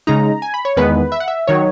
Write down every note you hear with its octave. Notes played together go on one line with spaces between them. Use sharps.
C#3 G#3 D#4 A#5
G#5
B5
C#5
E2 D#3 G#3 B3 B4
E5
F#5
E5
D#3 F#3 C#5